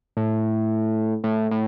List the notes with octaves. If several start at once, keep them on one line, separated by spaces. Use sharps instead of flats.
A2
A2
A2